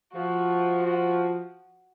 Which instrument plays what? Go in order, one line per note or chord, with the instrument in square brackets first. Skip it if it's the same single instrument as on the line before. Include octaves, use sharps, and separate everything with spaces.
[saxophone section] F3 [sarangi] F#4
[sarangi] F#4